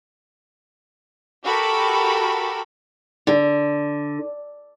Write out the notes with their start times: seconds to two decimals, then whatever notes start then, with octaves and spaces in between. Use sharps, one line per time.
1.43 F#4 G4 A4 A#4 B5
3.27 D3